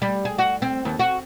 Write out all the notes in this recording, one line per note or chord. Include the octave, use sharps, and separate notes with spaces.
G3
G#4
F#4
C4
D#2
F#4